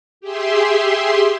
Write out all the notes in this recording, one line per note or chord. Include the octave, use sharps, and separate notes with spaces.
G4 G#4 E5 C6